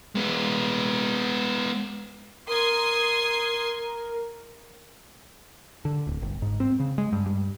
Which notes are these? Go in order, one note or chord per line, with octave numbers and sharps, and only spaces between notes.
G#3 B3
A#4 C6 D#6 G#6
D3
D1
G1
G#2
C4
C#3
G#3
G2
G2